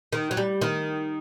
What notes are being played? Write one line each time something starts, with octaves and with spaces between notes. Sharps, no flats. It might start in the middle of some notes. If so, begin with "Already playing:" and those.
D#3
F#3
G3
D#3